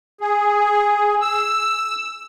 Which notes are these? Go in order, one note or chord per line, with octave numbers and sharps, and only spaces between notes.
G#4
E6